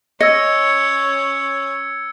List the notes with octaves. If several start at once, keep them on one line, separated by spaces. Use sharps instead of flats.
C#4 C#5 D#5 E6 G#6 C#7